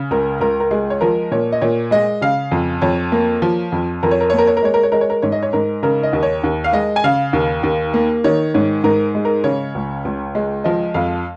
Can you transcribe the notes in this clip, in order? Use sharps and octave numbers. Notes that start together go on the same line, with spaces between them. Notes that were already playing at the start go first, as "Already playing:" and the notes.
Already playing: C#3
C#2 A#4
C#2 A#4
A#4
G#3 G#4
C#5
F3 A#4
A#2 C#5
D#5
A#2 C#5
G#3 D#5
C#3 F5
F2
F2 C#5
A#3
F3
F2
F2 A#4
C#5
A#4
A#3 C#5
A#4
C#5
A#4
G#3 C#5
A#4
C#5
G#3 A#4
C#5
A#4
G#2 C#5
D#5
C#5
G#2 A#4
C#3 A#4
D#5
D#2
C#5
D#2
F5
G#3 D#5
G#5
C#3 F5
D#2
D#2
A#3
D#3 C#5
G#2 C#5
G#2 A#4
G#3
A#4
C#3 C#5
C#2
C#2
G#3
F3 D#5
F2 F5